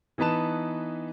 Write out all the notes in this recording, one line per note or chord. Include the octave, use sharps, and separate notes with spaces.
E3 B3 D#4 B4 A5 E7